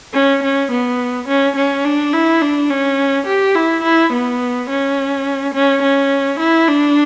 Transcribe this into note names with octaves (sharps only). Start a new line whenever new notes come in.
C#4
C#4
B3
C#4
C#4
D4
E4
D4
C#4
G4
E4
E4
B3
C#4
C#4
C#4
E4
D4